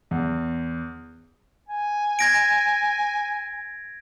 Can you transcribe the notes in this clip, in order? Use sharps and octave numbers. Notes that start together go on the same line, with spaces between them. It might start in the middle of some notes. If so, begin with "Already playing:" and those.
E2
G#5
G#6 A#6 D7